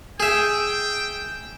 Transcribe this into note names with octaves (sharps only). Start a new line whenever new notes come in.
G#4 E5 G5